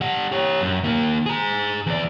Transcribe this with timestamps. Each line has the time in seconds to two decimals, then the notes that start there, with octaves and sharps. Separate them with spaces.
0.01 G3 F#5
0.32 G4 C#5
0.61 F#2
0.84 D#3 A#3
1.26 G#4 A#5
1.87 E2 D5